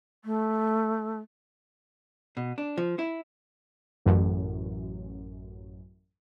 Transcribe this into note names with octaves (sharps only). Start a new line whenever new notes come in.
A3
B2
D4
F3
E4
A1 F#2